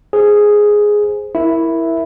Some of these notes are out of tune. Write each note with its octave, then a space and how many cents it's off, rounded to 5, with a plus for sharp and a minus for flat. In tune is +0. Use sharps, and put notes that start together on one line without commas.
G#4 +0 C5 +0
E4 +0 A#4 +0 E5 +0